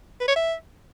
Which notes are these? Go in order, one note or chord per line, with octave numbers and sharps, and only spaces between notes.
B4
C#5
E5